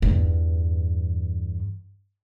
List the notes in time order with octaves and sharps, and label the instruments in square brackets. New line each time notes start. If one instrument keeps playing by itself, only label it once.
[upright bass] E2 G2